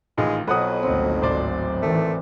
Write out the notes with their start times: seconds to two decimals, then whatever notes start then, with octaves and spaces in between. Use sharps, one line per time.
0.18 A1 D#3 G#3 F4
0.47 B1 F2 B2 F#3 B4 F#5 D#6
0.83 G#1 D2 F#3 C4 D#4
1.22 D1 C5 D5
1.82 D#3 E3 A3